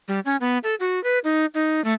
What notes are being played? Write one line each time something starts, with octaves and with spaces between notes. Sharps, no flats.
G3
C#4
B3
A4
F#4
B4
D#4
D#4
A3